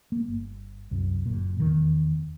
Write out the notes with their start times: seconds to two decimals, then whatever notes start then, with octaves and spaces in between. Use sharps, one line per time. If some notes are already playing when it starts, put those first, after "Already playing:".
0.12 A#3
0.28 G1
0.91 C2 F#2
1.26 F#1 A#2
1.60 F1 E2 D#3